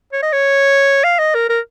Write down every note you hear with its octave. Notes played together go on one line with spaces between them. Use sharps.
C#5
D#5
C#5
F5
D#5
A#4
A#4